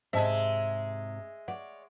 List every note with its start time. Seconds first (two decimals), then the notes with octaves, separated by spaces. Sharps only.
0.13 G#2 C3 G#3 C5 D#5 E5 A5
1.48 C#5 D5 F#5